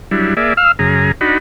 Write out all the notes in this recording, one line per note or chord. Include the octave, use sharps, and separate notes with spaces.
F#3 G3 D4 E4
A#3 G#4 D5 E5
F5 E6 F6
F#2 C#3 G#4 A#5
D4 D#4 F#4 B5